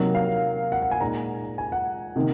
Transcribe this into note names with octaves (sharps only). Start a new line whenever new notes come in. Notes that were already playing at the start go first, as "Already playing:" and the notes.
Already playing: C3 F#3 A#3 D#4
F5
F#5
F#5
G#5
A#2 G#3 D#4 A#5
G#5
F#5
C3 D#3 A#3